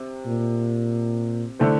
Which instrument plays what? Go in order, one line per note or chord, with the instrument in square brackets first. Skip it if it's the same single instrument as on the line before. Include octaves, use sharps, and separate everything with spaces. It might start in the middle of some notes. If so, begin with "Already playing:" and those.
Already playing: [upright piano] C3
[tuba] A#2
[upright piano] D3 A3 E4 A4 C5